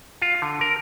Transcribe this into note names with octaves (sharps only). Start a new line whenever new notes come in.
F4
D3
A#4